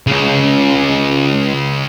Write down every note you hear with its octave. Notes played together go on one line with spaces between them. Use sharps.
C#2 C#3